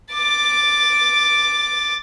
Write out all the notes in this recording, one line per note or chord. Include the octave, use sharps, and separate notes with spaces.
D6 A6